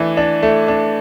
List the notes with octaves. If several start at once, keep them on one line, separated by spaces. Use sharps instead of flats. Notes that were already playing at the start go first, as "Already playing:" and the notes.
Already playing: E3 A3 D4
D4
A3
D4